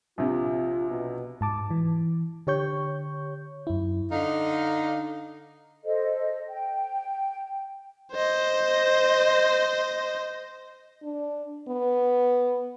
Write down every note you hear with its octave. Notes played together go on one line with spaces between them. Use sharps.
A#1 C3 F4
B2
G#2 A5 D6
E3
D3 G4 C#5 C#6 G6
F#2 E4
D3 D#4 F5
A4 C5 D#5
G5
C5 D#5
D4
B3